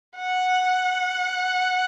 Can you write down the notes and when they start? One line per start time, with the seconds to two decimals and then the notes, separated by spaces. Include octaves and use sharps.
0.17 F#5